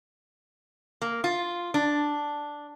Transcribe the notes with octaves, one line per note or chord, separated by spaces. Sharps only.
A#3
F4
D4